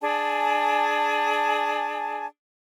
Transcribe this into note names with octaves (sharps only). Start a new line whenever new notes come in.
D4 G#4 G#5 A5